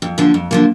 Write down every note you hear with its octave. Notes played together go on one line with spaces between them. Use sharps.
F2
D3 F3 A#3
F2
D3 F3 A#3